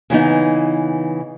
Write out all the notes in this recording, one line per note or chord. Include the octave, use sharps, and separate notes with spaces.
C#3 E3 B3 D#4